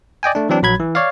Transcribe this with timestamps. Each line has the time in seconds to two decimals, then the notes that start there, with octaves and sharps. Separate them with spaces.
0.23 D5 D#5 G5 G#5
0.35 A3 D4
0.49 E3 F#3 C4 D4
0.62 A#1 F#3 B5 G#6
0.80 E3
0.95 C#5 D5 F5